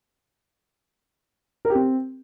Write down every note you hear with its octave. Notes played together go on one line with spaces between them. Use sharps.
A#4
G4
C4